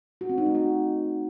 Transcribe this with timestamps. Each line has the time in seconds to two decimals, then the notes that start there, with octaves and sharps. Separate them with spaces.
0.21 F#4
0.29 C4
0.38 D#4
0.46 A3
0.55 F#4